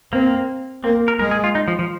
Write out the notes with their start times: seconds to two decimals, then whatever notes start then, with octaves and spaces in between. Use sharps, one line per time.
0.12 A#3 C4
0.83 A#3 C4
1.08 A#4
1.19 G#3 A#4
1.31 G#4
1.44 F4
1.55 D#4
1.68 F3
1.79 F3